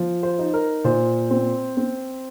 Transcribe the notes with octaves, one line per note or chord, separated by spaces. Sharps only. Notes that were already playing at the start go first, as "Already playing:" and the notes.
Already playing: F3
C5
D#4
A#4
A#2 C5
C4
C4